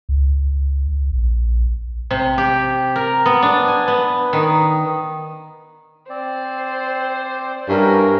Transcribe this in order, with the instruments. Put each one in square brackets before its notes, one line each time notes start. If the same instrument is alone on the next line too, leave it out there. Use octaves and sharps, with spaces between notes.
[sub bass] C#2
A#1
[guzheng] C3
G4
A#4
B3
D4
G#5
B3
D#3
[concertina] C4 D5 [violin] C5
[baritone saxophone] G2 [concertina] C#4 E4 F#4 [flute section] A#4